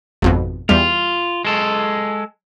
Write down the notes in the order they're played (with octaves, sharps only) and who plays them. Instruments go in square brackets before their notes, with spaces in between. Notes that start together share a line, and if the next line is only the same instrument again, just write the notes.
[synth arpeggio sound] G#1 F2 B2
[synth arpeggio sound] E2 G3 [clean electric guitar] F4
[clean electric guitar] G#3 A4